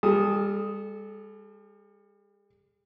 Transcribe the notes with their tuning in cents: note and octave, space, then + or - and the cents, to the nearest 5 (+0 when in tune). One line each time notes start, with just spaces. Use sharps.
G3 +40 A4 -25 D#6 +0